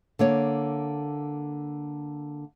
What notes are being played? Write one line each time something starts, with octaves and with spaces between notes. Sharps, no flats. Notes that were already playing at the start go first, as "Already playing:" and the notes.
D3 A#3 C#5